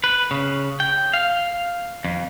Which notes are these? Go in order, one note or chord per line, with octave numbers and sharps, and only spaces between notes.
B4
C#3
G5
F5
F2